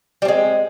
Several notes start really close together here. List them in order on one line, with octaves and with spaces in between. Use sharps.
G3 C4 G#3